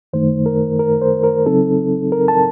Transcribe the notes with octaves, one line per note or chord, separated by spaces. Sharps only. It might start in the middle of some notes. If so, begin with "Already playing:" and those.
F#2 D#3 A3 D#4 C5
A#4
A#4
C5
A#4
C#3 F#3 C4 D#4 A4
A#4
A5